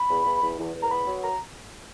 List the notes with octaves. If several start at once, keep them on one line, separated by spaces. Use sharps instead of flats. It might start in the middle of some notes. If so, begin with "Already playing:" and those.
Already playing: B5
E2
E2
E2
E2
E2
A#5
B3 B5
F#3
A#5